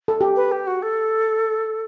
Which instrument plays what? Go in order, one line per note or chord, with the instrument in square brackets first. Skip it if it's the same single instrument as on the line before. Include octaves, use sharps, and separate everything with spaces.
[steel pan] A4
G4
[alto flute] B4
G4
F#4
A4